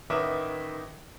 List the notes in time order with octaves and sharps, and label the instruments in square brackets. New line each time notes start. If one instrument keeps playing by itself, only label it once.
[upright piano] A1 D#3 D#4 B4 E5 D6